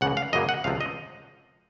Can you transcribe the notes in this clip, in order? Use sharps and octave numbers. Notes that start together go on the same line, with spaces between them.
C#2 C#3 F3 A#3 F#5
F5
F#2 C#3 F#3 A#3 D#5
F#5
C#2 C3 F3 C4 F5
D#5